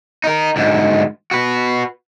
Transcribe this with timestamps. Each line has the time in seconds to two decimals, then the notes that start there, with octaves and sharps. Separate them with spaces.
0.24 D#4 A#4
0.56 D2 G#2
1.31 F#4 B4